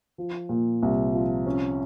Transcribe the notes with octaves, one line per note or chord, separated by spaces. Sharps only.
F3
A#2
C2
F3
C#4